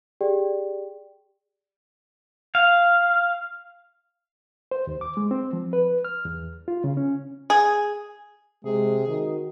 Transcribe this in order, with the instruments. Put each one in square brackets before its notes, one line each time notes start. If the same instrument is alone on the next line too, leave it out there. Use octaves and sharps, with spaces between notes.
[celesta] G4 G#4 D5 G5
[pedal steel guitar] F5
[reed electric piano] C5
D#2
D6
G#3
C4
F3
B4
F6
E2
F4
C#3
C#4
[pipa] G#4
[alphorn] C3 [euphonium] G#3 [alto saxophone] G#4
[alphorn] D#3 [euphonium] F#4